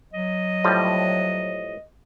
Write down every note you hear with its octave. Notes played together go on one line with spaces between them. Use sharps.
F#3 D#5
A2 F3 G3